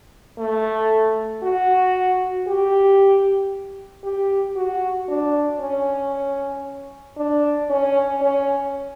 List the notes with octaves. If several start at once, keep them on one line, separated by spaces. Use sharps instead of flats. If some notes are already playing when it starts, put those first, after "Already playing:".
A3
F#4
G4
G4
F#4
D4
C#4
D4
C#4
C#4